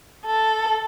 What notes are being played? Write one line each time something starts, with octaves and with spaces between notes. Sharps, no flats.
A4